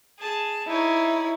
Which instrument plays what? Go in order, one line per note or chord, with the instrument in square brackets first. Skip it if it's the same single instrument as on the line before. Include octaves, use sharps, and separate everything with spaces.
[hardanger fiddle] G#4 A5
[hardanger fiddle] D#4 C#5 [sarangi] E4